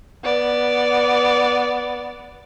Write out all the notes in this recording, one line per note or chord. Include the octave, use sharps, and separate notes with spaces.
B3 D5